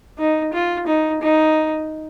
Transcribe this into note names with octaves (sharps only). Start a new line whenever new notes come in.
D#4
F4
D#4
D#4